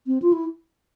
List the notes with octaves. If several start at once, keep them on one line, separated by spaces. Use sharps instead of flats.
C4
F4
E4